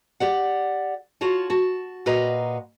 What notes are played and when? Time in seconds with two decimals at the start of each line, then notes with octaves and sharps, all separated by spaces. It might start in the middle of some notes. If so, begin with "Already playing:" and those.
0.20 G4 D5 F#5
1.21 F4 F#4 C#5 A5
1.50 F#4 A5
2.06 A#2 F#4 B4 D#5 F5 A#5